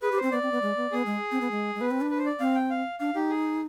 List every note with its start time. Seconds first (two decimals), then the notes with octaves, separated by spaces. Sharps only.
0.02 G#4 B4
0.12 G4
0.17 C5
0.22 C4
0.32 B3 D5
0.43 C4
0.52 B3
0.62 G#3
0.77 B3
0.92 B3 G#4
1.06 G#3
1.31 C4
1.41 B3
1.51 G#3
1.75 G#3
1.80 B3 B4
1.91 C4
2.01 D4
2.10 B4
2.18 C5
2.26 D5
2.40 C4 F5
2.55 G5
2.70 F5
2.99 D4 F5
3.15 D#4 G4
3.30 G#4